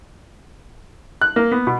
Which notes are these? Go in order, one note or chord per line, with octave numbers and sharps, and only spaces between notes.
F#6
A#3
B3
B2